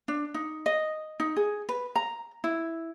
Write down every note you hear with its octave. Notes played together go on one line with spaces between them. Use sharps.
D4
D#4
D#5
D#4
G#4
B4
A#5
E4